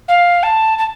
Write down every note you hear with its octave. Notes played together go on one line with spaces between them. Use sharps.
F5
A5
A5